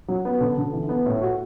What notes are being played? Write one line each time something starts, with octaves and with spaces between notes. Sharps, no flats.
F#3
B3
D3
D3
E3
B3
A2
F#4